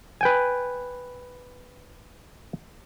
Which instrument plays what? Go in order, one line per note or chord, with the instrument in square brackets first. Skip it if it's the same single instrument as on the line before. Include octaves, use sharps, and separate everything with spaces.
[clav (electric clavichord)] B4 G5 G#5